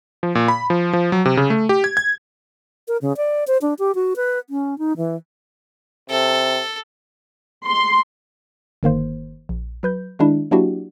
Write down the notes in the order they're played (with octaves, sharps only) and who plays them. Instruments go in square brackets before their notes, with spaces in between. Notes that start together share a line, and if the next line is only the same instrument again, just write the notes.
[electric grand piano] F3
A#2
B5
F3
F3
F#3
C3
C#3
A3
G4
G#6
G#6
[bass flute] A#4
C#3
D5
C5
D4
G4
F#4
B4
C#4
D#4
E3
[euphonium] C3 [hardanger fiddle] A4
[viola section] C6
[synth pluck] G1 D#3 A#3 C5
A#1
F#3 B4 G6
D#3 G#3 D4 E4
F#3 A#3 D4 E4 F#4 G4